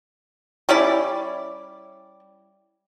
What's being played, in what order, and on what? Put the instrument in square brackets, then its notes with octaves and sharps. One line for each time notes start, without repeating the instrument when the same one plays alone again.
[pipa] G3 C#4 E4 D5